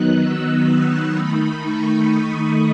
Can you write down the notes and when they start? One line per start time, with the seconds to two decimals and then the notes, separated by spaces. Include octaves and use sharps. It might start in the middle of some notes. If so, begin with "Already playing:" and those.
Already playing: D#3 F#3 B3 D#4 F#6
0.20 E6
1.13 D#3 A3 D#4 B5
1.60 C#6
2.07 D#6